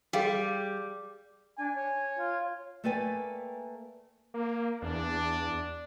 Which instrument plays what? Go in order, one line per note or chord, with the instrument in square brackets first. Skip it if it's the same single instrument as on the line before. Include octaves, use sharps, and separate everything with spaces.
[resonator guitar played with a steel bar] G3 [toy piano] G#4 F5 G5
[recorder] D4 [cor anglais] G#5
[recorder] C#5
[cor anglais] F4
[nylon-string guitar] A3 A#3 B4 D5 G5 G#5
[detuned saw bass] A#3
[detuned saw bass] E2 [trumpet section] D4